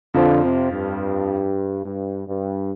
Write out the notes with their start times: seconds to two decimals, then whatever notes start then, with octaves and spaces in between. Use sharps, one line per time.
0.14 F2 D3 F3 C4 F4
0.43 C3
0.71 G2
1.84 G2
2.27 G2